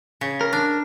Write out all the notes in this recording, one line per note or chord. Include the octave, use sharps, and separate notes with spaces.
C#3
A#4
D4